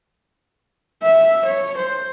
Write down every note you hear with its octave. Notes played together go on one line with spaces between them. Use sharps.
E5
C#5
C5